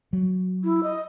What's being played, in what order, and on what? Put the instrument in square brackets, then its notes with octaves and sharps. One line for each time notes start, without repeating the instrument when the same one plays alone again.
[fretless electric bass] F#3
[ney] E4
D#5